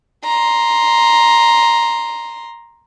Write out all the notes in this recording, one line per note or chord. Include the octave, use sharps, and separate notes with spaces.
A#5 C6